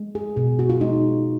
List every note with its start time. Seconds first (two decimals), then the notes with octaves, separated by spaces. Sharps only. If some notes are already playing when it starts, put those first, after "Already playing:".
Already playing: G#3
0.15 G#4
0.36 B2 G#4
0.59 F#4
0.70 F4
0.81 G#3 D#4